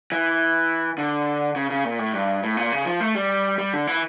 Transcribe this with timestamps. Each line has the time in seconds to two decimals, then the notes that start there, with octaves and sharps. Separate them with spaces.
0.12 E3
0.98 D3
1.56 C#3
1.70 C#3
1.85 A#2
1.99 A2
2.13 G2
2.43 A2
2.57 A#2
2.72 C#3
2.85 F3
3.01 A3
3.15 G3
3.58 G3
3.73 D3
3.87 E3